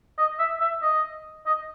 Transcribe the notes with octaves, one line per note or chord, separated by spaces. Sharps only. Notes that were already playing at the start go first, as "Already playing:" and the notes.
D#5
E5
E5
D#5
D#5